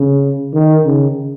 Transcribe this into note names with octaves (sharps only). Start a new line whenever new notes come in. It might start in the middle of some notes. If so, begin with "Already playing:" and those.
Already playing: C#3
D#3
C#3